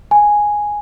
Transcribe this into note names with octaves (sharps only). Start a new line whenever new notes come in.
G#5